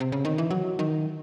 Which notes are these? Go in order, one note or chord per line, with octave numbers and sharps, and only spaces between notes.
C3
C#3
D#3
E3
F#3
D#3